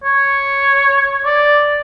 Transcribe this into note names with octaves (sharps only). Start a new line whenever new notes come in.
C#5
D5